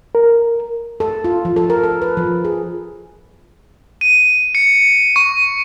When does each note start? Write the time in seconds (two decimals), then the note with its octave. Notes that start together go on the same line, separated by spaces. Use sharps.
0.15 A#4
1.00 A4
1.24 F4
1.45 F3
1.56 A4
1.70 A#4
1.84 A4
2.02 B4
2.17 F3
2.44 G#4
4.01 D#7
4.55 C#7
5.16 C#6